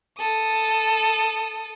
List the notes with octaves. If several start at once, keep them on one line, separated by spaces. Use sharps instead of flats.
A4 D#6